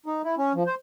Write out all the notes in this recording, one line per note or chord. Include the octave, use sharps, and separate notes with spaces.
D#4
E4
C#4
F3
C5